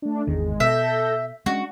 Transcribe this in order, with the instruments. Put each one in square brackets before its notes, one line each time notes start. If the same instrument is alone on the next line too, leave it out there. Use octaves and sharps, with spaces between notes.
[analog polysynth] A3 D4
[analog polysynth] G#1 G#3 [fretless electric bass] E2 D#3
[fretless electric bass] B2 [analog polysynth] A4 G6 A#6 [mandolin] E5
[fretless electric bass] G#3 C#4 [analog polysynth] D4 [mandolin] F#4